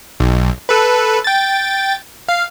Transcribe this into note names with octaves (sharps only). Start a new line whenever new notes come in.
B1
A4 B4
G5 A6
F5